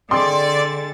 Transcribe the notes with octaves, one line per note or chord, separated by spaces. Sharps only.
D3 G#3 C4 D5 C6 A6